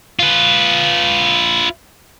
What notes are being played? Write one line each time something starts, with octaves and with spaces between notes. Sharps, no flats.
F4 B4